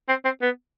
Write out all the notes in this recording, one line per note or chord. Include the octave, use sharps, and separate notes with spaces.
C4
C4
B3